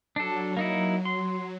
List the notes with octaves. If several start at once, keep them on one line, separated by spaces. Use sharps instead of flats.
F#3 D4 A4
A#3 D#4 E4
C6